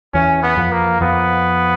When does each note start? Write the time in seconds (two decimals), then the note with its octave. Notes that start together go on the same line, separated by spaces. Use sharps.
0.14 E2 E3 C#4
0.43 B3
0.57 F2 F3
0.72 A#3
1.01 F2 F3 B3